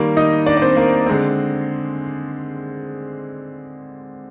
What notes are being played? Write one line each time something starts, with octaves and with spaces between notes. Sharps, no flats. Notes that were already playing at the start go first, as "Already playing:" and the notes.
Already playing: D#3 G3 A#3
D#4 D#5
D4 D5
D5
C4 C5
A#3 A#4
D3 G#3 C4